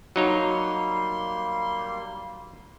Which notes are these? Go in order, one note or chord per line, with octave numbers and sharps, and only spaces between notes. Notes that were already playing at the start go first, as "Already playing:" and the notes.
F#3 G3 A#3 D#4 C#5 C6